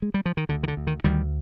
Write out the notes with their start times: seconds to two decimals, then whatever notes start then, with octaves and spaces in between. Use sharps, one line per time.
0.02 G#3
0.14 G3
0.26 F3
0.37 D#3
0.49 D2 D3
0.63 D#3
0.68 D3
0.77 D2
0.87 D#3
1.04 D2 D#3 G3